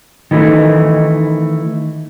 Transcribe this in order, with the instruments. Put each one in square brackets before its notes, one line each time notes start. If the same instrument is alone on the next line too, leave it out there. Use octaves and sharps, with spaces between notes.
[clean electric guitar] D#3 E3 A3